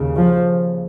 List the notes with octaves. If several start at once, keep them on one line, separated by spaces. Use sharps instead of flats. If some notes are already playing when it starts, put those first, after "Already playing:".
Already playing: D#2 C#3
F3